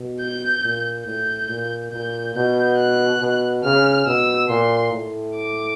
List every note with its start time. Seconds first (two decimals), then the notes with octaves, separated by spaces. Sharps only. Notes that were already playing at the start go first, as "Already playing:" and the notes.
Already playing: B2
0.20 G6
0.63 A#2
1.07 A2 G6
1.49 A#2
1.92 A#2 G6
2.35 B2 G6
2.78 F#6
3.20 B2
3.64 C#3 F6
4.07 B2 E6
4.49 A#2 C6
4.92 A2
5.35 D6